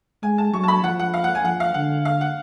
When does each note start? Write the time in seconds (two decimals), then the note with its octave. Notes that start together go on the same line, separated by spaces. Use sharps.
0.23 G#3 G#5
0.38 A5
0.53 F#3 C#6
0.63 A5
0.68 B5
0.83 F3 F#5
0.99 F#5
1.14 F5
1.24 F#5
1.35 G#5
1.45 F3 F#5
1.60 F5
1.74 D3 F#5
2.05 F5
2.21 F#5